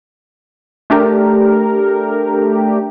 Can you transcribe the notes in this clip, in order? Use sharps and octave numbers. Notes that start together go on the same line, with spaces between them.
A3 D4 G4 A#4